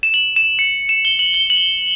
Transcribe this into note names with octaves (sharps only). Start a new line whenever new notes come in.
E7
F#7
E7
C#7
E7
G7
F#7
G7
F#7